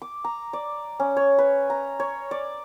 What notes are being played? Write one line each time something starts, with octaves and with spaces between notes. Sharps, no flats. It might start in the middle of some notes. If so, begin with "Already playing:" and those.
D6
A#5
D5
C#4
C#5
B4
A#5
C#5
D5